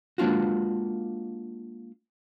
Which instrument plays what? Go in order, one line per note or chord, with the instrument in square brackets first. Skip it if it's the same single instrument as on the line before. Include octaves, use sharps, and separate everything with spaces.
[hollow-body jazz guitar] G#3 A#3 D4 F4 F#4